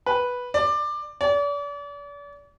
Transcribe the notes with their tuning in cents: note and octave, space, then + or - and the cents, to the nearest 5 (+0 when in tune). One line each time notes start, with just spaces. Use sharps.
B4 -5
D5 +20
D5 -40